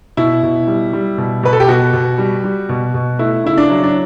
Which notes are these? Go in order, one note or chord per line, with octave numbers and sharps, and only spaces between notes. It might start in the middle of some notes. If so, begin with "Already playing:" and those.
B2 E4
B2
G3
G3
B2
B2 B4
A4
G4
B2 F#4
B2
G3
G3
B2
B2
A3 E4
C#3 E4
D4
F#3
D4